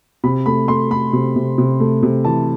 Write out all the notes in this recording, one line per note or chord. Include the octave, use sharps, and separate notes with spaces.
C3 B5
A3 B5
A3 C6
A3 B5
C3
C3
C3
A3
C3
E3 A5